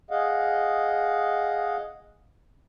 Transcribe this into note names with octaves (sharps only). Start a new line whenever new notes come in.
G#4 D#5 F5 F#5